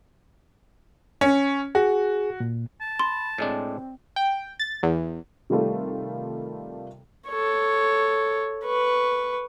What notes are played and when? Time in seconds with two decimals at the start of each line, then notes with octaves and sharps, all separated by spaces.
1.21 C#4
1.75 F#4 G#4
2.40 A#2
2.81 A5
2.99 B5 C6
3.38 A2 G#3 C4 D4
4.16 G5
4.59 A6
4.83 E2
5.50 C3 D#3 G3 A3 F4 A4
7.28 A4 C#5
8.65 B4 C#6